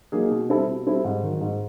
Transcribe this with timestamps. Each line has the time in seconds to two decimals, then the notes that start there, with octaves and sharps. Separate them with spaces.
0.12 F#3 A#3 D#4 G#4
0.31 B2
0.50 G3 C4 E4 A4
0.67 B2
0.87 G3 C4 E4 A4
1.04 G#2
1.23 D#3 F#3
1.41 G#2